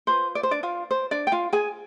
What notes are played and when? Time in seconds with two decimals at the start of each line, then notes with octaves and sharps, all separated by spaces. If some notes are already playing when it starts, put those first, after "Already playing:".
0.07 F4 B4 C5
0.35 D5
0.43 C5
0.51 D4 D5
0.63 F4 F5
0.91 C5
1.11 D4 D5
1.27 G5
1.32 F4 F5
1.53 G#4 G#5